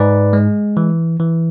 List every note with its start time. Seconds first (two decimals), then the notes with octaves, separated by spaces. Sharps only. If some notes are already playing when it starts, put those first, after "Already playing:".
Already playing: G#2 B4 D5
0.33 G#3
0.77 E3
1.20 E3